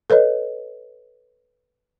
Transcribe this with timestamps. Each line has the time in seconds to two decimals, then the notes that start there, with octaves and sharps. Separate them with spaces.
0.10 A4 B4 C#5 D#5